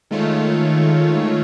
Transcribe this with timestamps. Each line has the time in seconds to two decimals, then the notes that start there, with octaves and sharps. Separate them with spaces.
0.11 D#3 G#3 A3 F4 C#5